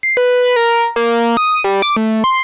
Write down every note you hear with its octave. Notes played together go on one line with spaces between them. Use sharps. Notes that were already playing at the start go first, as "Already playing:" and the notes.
C7
B4
A#4
A#3
D#6
G3
D6
A3
C6